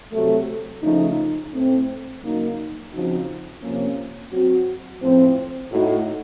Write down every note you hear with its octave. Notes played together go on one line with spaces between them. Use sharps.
C3 F#3 A3
C#3 F3 A3 D#4
A2 A3 C4
C#3 F#3 A#3 D#4 F#4
C#3 F3 C4 D#4 F#4
C3 F3 A#3 C#4
F#3 C4 F#4
A2 F3 C4
A2 A3 D#4 F#4